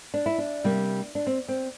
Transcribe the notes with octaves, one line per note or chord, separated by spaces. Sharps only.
D4
E4
D4
C3 G3 A#3
D4
C4
C4